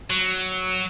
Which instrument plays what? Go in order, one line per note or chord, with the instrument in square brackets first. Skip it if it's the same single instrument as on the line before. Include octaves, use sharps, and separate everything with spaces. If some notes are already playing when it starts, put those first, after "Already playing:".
[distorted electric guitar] F#3